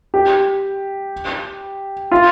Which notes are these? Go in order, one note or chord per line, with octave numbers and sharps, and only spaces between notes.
G4
F4